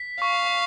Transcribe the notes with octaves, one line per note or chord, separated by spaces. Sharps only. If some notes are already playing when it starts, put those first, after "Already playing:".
Already playing: B6
F5 C#6